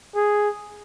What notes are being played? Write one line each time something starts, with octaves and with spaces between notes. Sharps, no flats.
G#4